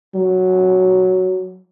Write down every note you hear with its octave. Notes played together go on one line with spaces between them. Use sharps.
F#3